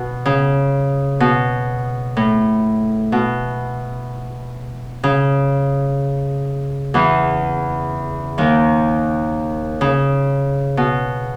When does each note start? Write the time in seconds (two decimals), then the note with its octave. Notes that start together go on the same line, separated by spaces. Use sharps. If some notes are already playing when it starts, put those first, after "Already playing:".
Already playing: B2
0.25 C#3
1.20 B2
2.17 A2
3.12 B2
5.03 C#3
6.94 E2 E3
8.38 D#2 D#3
9.81 C#3
10.77 B2